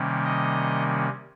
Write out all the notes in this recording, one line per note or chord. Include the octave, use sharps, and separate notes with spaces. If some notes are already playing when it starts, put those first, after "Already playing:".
Already playing: C3 D#3 G3 A#3 C#4
D#5